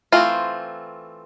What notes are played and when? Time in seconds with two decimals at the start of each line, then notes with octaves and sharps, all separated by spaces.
0.12 E3 A3 C4 F4